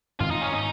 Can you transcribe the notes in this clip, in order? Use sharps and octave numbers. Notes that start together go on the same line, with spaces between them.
G#2 D#3 G#3 C4 F4
D#4
C#4
D#4